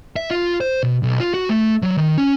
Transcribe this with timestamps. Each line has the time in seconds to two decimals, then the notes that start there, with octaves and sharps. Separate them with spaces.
0.16 E5
0.31 F4
0.61 C5
0.83 B2
1.03 B1
1.20 F4
1.34 F#4
1.49 A3
1.83 F#3
1.97 D#3
2.18 C#4